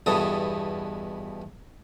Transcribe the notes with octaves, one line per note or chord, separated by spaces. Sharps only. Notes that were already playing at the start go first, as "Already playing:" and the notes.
E2 G2 B2 A4 D#6